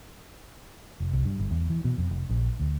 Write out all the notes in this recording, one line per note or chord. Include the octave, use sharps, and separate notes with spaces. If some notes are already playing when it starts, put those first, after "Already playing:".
F1
C2
G2
G1
E2
E3
B2
F2
F1
A#1
D2